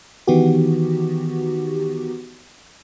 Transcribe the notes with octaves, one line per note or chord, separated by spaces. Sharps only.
D#3 E3 B3 D#4 F#4 G4